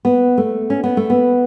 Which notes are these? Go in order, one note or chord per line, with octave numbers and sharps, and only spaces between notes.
B3
A3
C#4
B3
A3
B3